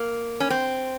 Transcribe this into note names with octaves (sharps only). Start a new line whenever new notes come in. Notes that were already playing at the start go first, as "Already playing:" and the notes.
Already playing: A#3
C#4
C4